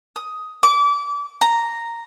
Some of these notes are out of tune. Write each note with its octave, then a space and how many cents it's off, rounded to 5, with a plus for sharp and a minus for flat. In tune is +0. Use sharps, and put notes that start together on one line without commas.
D#6 +10
D6 -30
A#5 -5